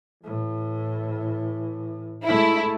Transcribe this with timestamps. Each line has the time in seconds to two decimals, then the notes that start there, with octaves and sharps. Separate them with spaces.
0.23 A2 E3
2.26 G#3 A3 E4